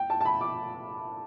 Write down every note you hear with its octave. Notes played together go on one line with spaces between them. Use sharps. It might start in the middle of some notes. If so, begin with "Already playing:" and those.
Already playing: G5
A5
A5
B5
D6